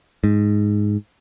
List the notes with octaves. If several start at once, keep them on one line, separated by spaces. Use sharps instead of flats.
G#2